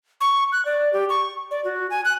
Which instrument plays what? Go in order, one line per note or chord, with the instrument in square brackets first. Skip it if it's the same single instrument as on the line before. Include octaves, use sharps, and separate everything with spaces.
[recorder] C#6
F#6
D5
G4
C#6
D5
F#4
G#5
F#6